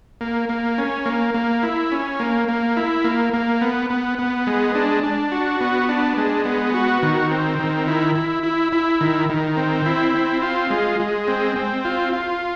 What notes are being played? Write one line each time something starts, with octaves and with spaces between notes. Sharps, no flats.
A#3
A#3
C#4
A#3
A#3
E4
C#4
A#3
A#3
E4
A#3
A#3
B3
B3
B3
G#3
D4
D4
F#4
B3
D4
G#3
B3
F#4
D#3
C4
D#3
E4
E4
E4
E4
D#3
D#3
C4
E4
C4
F4
G#3
G#3
C4
C4
F4
F4